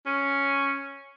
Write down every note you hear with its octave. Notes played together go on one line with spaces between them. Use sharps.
C#4